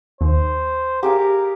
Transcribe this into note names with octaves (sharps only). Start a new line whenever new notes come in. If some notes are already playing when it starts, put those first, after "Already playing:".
D#2 C5
G4 G#4 A#4 F5